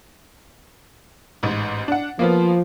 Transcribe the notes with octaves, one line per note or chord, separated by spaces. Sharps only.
A1 G#2
D4 F#5
F3 A#3 B3 F4